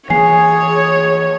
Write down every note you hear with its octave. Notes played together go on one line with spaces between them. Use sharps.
E3 A#3 G#4 C#5 G#5 C7